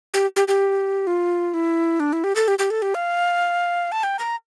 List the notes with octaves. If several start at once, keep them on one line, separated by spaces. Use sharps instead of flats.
G4
G4
G4
F4
E4
D4
E4
G4
A4
G4
G4
A4
G4
F5
A5
G5
A#5